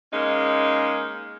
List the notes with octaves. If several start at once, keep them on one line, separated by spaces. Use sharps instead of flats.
G#3 A#3 C#4 D#4